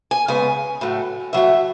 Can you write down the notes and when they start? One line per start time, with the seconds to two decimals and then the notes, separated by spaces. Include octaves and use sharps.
0.11 G#5
0.28 C#3 G#3 B3 G#5
0.81 A2 F#3 A3
1.33 A2 F#3 A3 E5